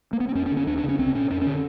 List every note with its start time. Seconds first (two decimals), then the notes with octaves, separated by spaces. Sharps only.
0.13 A#3
0.20 B3
0.29 C4
0.35 F2 C#4
0.46 C#4
0.51 D3
0.57 C#4
0.67 D#2 D4
0.78 D4
0.84 C#3
0.89 C#4
0.99 C2 C4
1.14 A#2 C#4
1.30 F2 C#4
1.41 C#4
1.46 D3